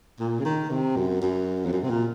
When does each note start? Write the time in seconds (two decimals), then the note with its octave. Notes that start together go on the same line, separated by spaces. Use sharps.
0.19 A#2
0.39 C#3
0.45 D#3
0.70 C3
0.96 F#2
1.22 F#2
1.65 F2
1.73 F#2
1.83 C3
1.90 A#2